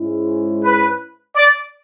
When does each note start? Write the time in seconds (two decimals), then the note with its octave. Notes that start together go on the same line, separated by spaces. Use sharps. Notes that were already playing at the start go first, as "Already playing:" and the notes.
Already playing: G#2 G#3 C#4 E4
0.64 B4
1.35 D5